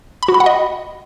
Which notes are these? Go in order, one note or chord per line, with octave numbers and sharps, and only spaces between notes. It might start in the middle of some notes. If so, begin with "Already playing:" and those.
B5
F#4
B5
F#5
D#5